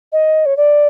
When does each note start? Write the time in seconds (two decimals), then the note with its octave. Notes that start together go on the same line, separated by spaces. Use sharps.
0.12 D#5
0.46 C#5
0.57 D5